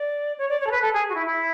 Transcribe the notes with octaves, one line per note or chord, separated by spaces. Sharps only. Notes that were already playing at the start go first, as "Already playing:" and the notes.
Already playing: D5
C#5
D5
C#5
A4
B4
A4
G#4
F#4
E4
E4